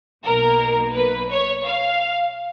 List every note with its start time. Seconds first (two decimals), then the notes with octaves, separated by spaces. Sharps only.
0.24 B1 B2 A#3 A#4
0.95 B4
1.30 C#5
1.65 F5